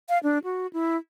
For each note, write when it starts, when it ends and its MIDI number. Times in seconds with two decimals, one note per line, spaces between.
0.09 0.18 77
0.23 0.38 62
0.44 0.67 66
0.73 0.97 64